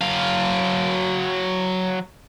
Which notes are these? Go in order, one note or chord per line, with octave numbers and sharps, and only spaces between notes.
F#3 F5